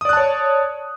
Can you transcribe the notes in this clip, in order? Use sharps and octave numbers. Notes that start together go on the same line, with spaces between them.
C#5 D5 A5 D#6 F#6